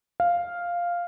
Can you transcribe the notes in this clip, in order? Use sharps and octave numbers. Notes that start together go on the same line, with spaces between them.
F5